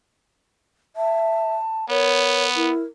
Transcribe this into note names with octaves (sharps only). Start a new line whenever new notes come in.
E5 A5
B3 A#4 C#5
E4 A#4